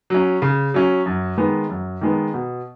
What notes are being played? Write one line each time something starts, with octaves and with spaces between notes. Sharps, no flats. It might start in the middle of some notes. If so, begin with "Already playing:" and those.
F#3 C#4
C#3
F#3 C#4
F#2
D#3 G#3 B3
F#2
D#3 G#3 B3
B2